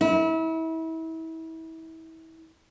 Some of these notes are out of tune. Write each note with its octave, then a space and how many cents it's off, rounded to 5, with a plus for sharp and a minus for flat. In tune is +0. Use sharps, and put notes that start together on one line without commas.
E4 -30